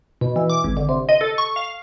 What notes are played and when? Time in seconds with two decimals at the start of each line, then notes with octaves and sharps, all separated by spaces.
0.21 B2
0.36 E3
0.50 D6
0.64 G#1
0.77 D3
0.89 C3
1.09 D#5
1.21 A4
1.38 C#6
1.56 F5